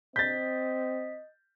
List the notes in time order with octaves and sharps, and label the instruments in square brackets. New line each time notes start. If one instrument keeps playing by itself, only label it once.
[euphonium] C4 [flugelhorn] D#5 [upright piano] G6 A6 [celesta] B6